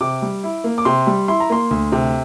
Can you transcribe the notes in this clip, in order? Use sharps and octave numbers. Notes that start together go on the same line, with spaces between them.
C3 D6
G3
E4
A#3
D6
C3 C6
G3
E4 C6
A#5
A#3 C6
D2
C3